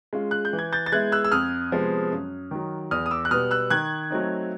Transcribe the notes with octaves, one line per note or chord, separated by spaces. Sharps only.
G#3 C#4 F4
F#6
G6
E3
G#6
G6 A6
A6
G#3 B3 E4 F#6 G#6
E6 F#6
E6
F2 D#6 F6
C3 F3 G#3 B3
F#2
D#3 F#3
E2 D#6 F6
D#6
D6 E6
F#6
B2 G3 B3 D#6 F6
E6 F#6
D#3 F#6 G#6
F#3 A3 C4 D#4